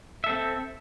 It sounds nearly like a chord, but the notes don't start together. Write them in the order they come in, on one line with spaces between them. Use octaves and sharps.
E5 A4 C4